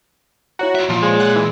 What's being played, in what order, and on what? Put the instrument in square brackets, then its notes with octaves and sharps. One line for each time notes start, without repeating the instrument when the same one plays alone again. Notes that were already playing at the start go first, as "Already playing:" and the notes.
[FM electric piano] E4 C#5 A#5 [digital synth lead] F#4
[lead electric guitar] F4 E5
[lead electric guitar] A#2 [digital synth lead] F3
[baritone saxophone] G#3
[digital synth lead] F#5
E3